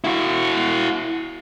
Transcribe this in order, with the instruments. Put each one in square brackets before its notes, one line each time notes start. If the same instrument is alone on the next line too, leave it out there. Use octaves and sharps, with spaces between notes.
[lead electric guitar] E4 F#4